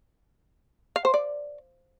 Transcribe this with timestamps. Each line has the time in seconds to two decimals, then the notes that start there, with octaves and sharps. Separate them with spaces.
0.96 F5
1.05 C5
1.14 D5